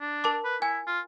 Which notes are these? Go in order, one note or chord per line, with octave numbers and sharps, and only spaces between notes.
D4
A#4 A5 D6
B4
E4 G#5
F4